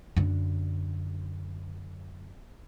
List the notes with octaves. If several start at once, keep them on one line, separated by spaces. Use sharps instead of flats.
F#2 D3